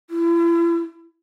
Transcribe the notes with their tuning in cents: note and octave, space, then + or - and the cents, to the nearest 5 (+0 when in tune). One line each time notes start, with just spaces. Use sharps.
E4 +40